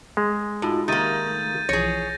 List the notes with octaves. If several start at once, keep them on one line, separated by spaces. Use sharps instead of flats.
G#3
A2 D#4 F4 F#4
D#3 A#3 G4 E5 G6 A6 D#7
A3
B1 E3 F3 G#4 C#5 A#6